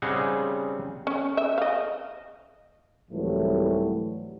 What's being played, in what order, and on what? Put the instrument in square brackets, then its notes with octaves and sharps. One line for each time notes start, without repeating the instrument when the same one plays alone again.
[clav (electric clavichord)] C#3 G3 C4 D#4 G#4 F#5
[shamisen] C#4
E5
D#5 F5
[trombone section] C2 G#2 E3 F#3 G3 A3